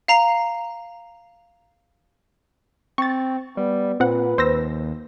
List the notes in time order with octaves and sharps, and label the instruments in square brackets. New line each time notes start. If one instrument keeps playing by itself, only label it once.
[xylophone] F5 A#5 C7 F7
[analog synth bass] C4 [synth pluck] C#6 A6
[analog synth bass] G3 [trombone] B3
[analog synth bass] A#2 [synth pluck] C4 F#5 [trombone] B4
[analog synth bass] D#2 [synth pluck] C5 E6 A#6